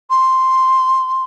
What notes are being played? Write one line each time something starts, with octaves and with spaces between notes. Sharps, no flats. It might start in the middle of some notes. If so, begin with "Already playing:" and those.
C6